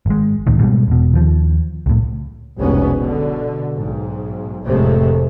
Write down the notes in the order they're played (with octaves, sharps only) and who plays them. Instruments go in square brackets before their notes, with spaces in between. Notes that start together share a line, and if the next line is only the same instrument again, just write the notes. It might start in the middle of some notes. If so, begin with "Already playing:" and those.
[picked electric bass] G#1 G#3
C#2 A2 D#3
G#2 B2 G3
E1 B2
D#2 F3
C#2 A2
[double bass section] F1 C2 G#2 B2 B3 C#4
B2 D3
B1 G#2
F1 F2 A2 C3 G#3 A3